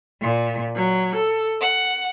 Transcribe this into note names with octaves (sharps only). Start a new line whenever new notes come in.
A#2
F#3
A4
F#5